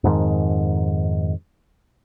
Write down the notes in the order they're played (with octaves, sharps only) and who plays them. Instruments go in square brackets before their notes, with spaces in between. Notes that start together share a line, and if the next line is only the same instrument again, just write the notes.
[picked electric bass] F2 G#2 D#3